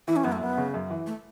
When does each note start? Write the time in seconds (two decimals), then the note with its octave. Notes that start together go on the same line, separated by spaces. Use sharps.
0.08 E3 E4
0.16 C#4
0.24 F#2 B3
0.32 A3
0.41 F#2 B3
0.58 C#3
0.74 F#2
0.90 E3
1.06 A3